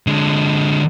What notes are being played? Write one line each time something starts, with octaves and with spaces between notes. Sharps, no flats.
D3 G#3